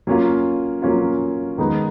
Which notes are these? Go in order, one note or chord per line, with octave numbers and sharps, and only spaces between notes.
F#3 A#3 C#4 F4
F#3 A#3 C#4 F4
D#3 G#3 B3 D#4